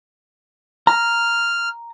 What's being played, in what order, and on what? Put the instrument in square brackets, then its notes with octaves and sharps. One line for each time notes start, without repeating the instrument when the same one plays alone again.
[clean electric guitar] A#5 [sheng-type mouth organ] F6